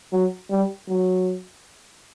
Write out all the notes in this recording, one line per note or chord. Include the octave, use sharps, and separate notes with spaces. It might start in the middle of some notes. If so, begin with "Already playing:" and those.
F#3
G3
F#3